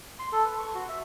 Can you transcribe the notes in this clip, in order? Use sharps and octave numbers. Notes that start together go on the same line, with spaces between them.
C6
A4
B4
C#6
F#4
E5